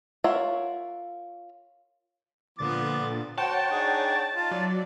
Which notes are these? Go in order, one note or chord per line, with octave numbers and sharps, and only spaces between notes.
F4 A#4 C#5 E5 F#5
A#2 D3 F3 B3 D6 A6
F#4 C5 C#5 F#5 G5 A5
D4 D#4 G#4
D#4 F4
F#3 D5